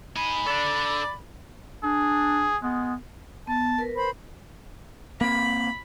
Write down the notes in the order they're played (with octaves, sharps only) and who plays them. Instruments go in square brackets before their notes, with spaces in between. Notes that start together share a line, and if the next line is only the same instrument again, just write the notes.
[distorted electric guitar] D#4 G#5 [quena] B5
[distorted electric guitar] D4 A4 [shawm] D5
[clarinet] D4 [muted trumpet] G#4
[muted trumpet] G#3 [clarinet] B3
[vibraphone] B3 [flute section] A5
[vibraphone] A#4 B4
[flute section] C5 B5
[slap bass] A#3 C4 [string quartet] B5